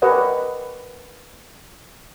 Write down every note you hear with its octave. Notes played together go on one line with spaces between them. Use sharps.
G4 A#4 B4 C#5 D#5 F#5